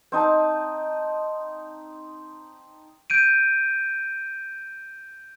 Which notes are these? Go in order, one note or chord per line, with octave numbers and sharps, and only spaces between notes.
C4 D#4 D#5 A5
G6 D7 D#7